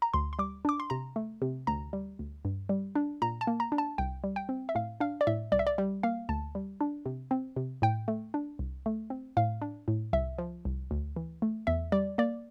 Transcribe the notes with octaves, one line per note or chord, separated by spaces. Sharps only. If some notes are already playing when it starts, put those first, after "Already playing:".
A#5
D2 C6
C6
G3 D6
D4 D6
C6
C3 A#5
A3
C3
D2 A#5
G3
D2
G2
G3
D4
A#2 A#5
A5
A#3
A#5
D4
A5
C2 G5
G3
G5
C4
E5
A2 F5
D4 F5
D5
A2 E5
C2 D5
E5
D5
G3
A#3 F5
D2 A5
G3
D4
C3
C4
C3
A2 G5
A3
D4
C2
A3
C4
A2 F5
D4
A2
C2 E5
F3
C2
D2
E3
A3
E2 E5
G3 D5
A#3 D5